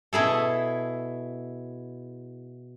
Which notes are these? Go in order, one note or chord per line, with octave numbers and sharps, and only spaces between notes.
B2 E4 G#4 A4